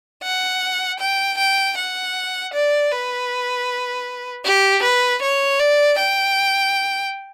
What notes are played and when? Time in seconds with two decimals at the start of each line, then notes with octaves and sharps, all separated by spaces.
0.23 F#5
1.00 G5
1.38 G5
1.78 F#5
2.54 D5
2.92 B4
4.45 G4
4.83 B4
5.22 C#5
5.59 D5
5.99 G5